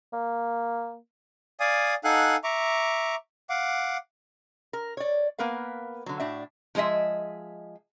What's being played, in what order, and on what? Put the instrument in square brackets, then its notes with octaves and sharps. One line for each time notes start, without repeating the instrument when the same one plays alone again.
[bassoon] A#3
[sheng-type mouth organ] D5 F5 G#5 D#6
D#4 A4 F5 F#5 G#5 F#6
E5 A#5 C#6 D6
F5 F#5 D6
[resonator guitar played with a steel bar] A#4
C#5 D5
A#3 B3 A#4 B4 F5
D3 F#3
A2 D4 F#4 E5
F3 G#3 G#4 D#5 E5